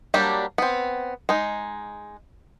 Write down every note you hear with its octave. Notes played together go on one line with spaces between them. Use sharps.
F#3 G3 A#3 D4 G4
B3 C4
G#3 D#4